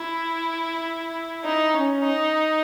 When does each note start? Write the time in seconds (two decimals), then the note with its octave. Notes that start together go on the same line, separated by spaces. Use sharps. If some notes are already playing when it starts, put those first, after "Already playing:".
Already playing: E4
1.45 D#4
1.74 C#4
2.02 D#4